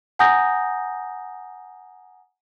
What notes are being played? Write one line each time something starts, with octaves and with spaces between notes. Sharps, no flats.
F#5 G#5 A#5 D#6 G6 A#6